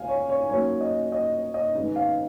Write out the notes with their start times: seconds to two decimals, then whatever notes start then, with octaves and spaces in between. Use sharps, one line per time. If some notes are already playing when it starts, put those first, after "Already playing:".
Already playing: C#2 G#3 F5 G#5
0.08 C#5
0.29 C#5
0.50 G#2 F#3 A#3 C#4 C#5
0.81 D#5
1.12 D#5
1.54 D#5
1.75 G#2 D#3 G#3 B3
1.96 F5